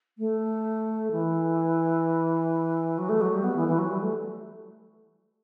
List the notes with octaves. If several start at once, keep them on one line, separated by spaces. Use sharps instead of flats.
A3
E3
F#3
A3
F#3
G3
B3
E3
E3
F#3
G3
A3